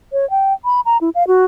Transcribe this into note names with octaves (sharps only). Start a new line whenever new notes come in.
C#5
G5
B5
A#5
E4
F5
F#4